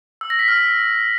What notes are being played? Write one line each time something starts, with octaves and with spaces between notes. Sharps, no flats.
E6
A#6
B6
F6
B6